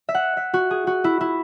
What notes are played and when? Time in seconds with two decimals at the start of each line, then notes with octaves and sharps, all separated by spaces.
0.09 E5
0.15 F#5
0.37 E5
0.54 F#4
0.71 G#4
0.87 F#4
1.04 E4
1.21 E4